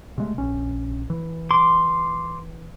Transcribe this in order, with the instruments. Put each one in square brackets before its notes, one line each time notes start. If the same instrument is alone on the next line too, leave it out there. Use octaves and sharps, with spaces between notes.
[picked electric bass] C3 G#3 A3
A#1 C#4
E3
[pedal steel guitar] C6 D6